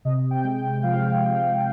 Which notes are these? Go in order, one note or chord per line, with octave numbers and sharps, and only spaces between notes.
C3 D#5
G5
G#3
F3 F5
F3